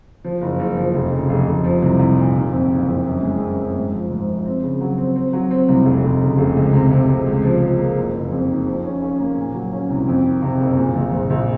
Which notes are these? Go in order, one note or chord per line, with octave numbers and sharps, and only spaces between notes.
F3
F#1
F#1
F3
F1
C#3
F1
F1
F3
C2
C2
A#2
D#3
F2
F#1
F2
F#2
G#3
F#2
F#2
G#2
F3
G#2
F3
C4
C#3
F#3
C4
C4
F#3
C4
C2
F1
F1
C#3
F1
C#2
C3
C3
C3
C#2
F3
F3
A#3
F#1
F#1
F2
D#3
F3
C#4
C#4
A#3
A#2
F#3
C#4
C2
F2
D#3
C3
F#1
A#2
A#1
A#1
A#1